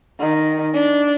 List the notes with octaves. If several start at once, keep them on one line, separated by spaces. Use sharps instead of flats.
D#3
D4